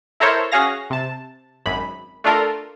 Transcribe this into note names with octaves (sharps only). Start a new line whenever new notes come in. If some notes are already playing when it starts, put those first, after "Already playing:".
E4 A4 A#4 C5 C#5 E5
C#4 F#4 G#4 F5 A#6
C3 A5
G#1 F#2 B5
A3 D4 F4 A4 A#4